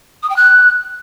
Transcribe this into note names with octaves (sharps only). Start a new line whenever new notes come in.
D#6
G5
F#6